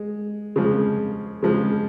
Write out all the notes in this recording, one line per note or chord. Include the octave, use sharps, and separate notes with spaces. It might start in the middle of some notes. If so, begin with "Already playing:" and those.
Already playing: G#3
C#3 F3 G#3
C#3 F3 G#3